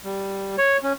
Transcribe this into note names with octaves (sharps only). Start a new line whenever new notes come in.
G3
C#5
C#4